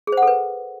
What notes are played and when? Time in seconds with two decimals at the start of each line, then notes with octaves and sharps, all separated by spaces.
0.07 G#4
0.12 C5
0.17 F#5
0.22 A4
0.27 B4